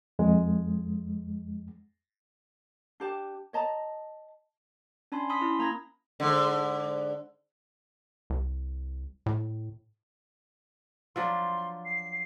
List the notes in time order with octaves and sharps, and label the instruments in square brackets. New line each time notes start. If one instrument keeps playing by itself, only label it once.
[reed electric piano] F2 G#3
[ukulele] D4 G4 A5
C#5 D#5 A5 A#5
[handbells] C#4 D4 G#5 A5 B5 C6
A5 B5 C6 D#6 E6 B6
C#4 E4
A#3 A#5 B5 G#6 A#6
[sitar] G#2 D3
[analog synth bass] C2
A2
[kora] F3 F#3 D4 [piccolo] C6
[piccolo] C7